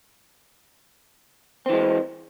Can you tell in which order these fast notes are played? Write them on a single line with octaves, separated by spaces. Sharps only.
C4 E3 G#3